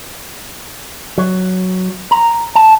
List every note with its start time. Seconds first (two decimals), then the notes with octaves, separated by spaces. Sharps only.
1.18 F#3
2.11 A#5
2.55 A5